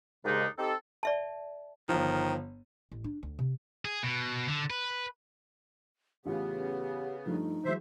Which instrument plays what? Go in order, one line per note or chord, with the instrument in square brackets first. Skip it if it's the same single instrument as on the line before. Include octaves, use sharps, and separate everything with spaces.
[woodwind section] D#2 G#2 C#3 G#3 D4 D#4
C4 D#4 G4 A4
[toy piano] D5 E5 A5
[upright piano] G1 F3 [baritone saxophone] D#3
[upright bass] A1
D4
D2
C3
[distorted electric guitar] G#4
B2
D3
B4
[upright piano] A1 F4 [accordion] C#3 B3 [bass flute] G4
[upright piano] G2 F3 A3 [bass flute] D#4
[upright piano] E3 F#3 G#3 [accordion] C5 E5